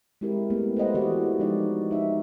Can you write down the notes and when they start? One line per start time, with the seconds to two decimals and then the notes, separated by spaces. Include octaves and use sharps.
0.21 G#3 C4 E4 G4 A#4
0.50 A3 B3
0.77 B4 C5 D#5 F#5
0.95 E3 B3 F#4 G4 B4 D5
1.39 F3 G#3 D#4 D5
1.91 D#4 E5